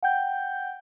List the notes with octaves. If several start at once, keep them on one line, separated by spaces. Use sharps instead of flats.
F#5 G5 G6